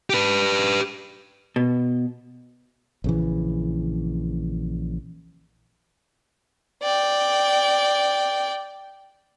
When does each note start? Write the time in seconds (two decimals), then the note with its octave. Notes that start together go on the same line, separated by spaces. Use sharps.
0.10 G4 B4
1.56 B2
3.04 A#1 C#3 E3
6.83 D5 G5